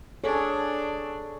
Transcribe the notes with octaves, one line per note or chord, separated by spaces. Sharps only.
D4 G#4 A4 C#5